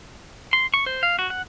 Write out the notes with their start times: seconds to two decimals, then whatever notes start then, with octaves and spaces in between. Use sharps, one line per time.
0.53 C6
0.74 C#6
0.86 C5
1.03 F5
1.19 F#4
1.30 F#5